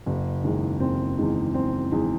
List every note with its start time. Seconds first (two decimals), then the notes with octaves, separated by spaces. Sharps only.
0.06 F#1
0.44 E2 D#3 G#3
0.80 F#1 C4
1.17 E2 D#3 G#3
1.54 F#1 C4
1.92 E2 D#3 G#3